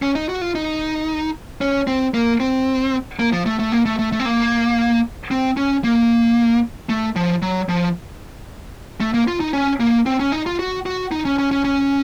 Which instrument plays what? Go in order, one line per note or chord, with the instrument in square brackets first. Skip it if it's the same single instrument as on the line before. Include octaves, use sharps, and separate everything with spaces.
[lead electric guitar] C#4
D#4
F#4
F4
D#4
C#4
C4
A#3
C4
A#3
F3
A3
A3
A#3
A3
A3
A3
C4
A#3
C4
C#4
A#3
A3
F3
F#3
F3
A3
A#3
F4
D#4
C#4
A#3
C4
C#4
D#4
F4
F#4
F#4
D#4
C#4
C#4
C#4
C#4